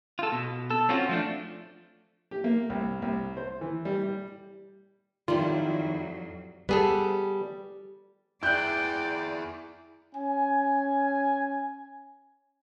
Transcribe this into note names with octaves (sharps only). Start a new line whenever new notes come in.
F4 A4
B2
A4
C4 C#4 F4 F#4
F3 A3 D4
G4
A#3
C2
C2
C5
E3
G3
G3
F2 A2 D#3 F#3 G3 E4 F4
G3 B3 G#4 A4
E4 G#4 D5 G5 F#6 G6
C#4 G#5